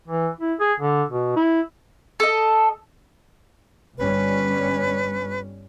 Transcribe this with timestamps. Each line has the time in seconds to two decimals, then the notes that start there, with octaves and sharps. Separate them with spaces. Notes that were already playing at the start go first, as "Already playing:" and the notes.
0.08 E3
0.40 E4
0.60 G#4
0.80 D3
1.09 B2
1.36 E4
2.20 A4 D#5
3.98 G1 G3 C#4 B4